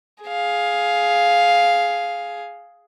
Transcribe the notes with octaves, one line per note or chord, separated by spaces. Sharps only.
G#4 F5